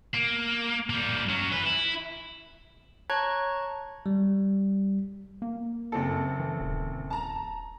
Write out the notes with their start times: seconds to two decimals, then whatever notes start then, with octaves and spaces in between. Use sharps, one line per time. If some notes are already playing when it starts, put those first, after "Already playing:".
0.14 A#3
0.90 G3 A#3
1.29 F#3 C#4
1.52 E3 B4
1.64 E4
3.10 C#5 A5 A#5 C#6 F#6 G#6
4.06 G3
5.42 A#3
5.92 F#1 C4 A4
6.40 E3
6.61 D#1
7.10 A5 A#5